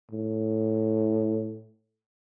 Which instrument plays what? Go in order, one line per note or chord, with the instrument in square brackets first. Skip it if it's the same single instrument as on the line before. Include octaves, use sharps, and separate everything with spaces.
[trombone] A2